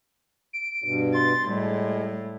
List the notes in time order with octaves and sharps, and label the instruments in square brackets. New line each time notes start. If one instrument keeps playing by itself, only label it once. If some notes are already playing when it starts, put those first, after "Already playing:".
[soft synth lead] D7
[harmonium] G2 B2
[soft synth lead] C6 [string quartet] A6
[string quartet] A2 [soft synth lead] G3 [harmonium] G#3